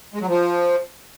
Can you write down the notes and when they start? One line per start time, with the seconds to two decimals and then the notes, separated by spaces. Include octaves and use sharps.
0.14 G#3
0.21 F#3
0.28 F3